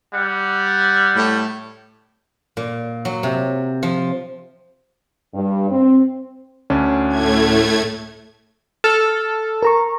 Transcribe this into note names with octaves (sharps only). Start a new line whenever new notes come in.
G3 F#5
A2
A#2
F#3
C3
F3
G2
C4
D2 C#4 D4
A2 A3 G#6
A4 F6
A#4 A#5 C#6